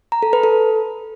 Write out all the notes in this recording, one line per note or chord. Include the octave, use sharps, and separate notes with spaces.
A#5
A4
B4
A4